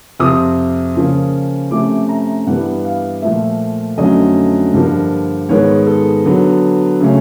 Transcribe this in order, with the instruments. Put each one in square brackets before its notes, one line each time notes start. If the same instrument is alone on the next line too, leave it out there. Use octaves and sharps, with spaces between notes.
[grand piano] F2 C3 F3 D#6
C#3 F3 A#3 C#4
C3 F3 A3 C#4 D6
A#5
G2 E3 G3 B3 F#5
F5
A#2 F3 A3 E5
F2 D3 F#3 A3 C#4 D#5
G2 D3 F3 A#3
G#2 D#3 G#3 B3 C#5
A4
D3 F#3 B3
C#3 F#3 A3 C#4